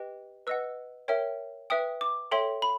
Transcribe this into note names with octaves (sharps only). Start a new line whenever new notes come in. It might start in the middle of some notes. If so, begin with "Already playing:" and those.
Already playing: G4 B4 D#5 G5
B4 D#5 F#5 E6
A#4 C#5 E5 G5
B4 E5 G5 D#6
D6
A4 C#5 E5 G5 C6
B5